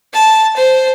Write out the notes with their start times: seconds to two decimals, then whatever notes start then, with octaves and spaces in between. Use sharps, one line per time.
0.14 A5
0.56 C5